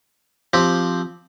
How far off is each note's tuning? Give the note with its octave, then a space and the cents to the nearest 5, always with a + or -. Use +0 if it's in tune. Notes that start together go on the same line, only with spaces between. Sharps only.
F3 +0 C4 +0 G4 +0